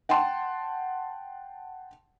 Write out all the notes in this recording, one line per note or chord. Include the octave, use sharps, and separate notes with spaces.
F#5 G5 A5 C6